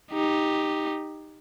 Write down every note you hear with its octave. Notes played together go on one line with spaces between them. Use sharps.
D#4 G4